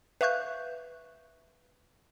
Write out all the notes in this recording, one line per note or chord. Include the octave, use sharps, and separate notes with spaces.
B4 E5 F5 C#6 F#6 G6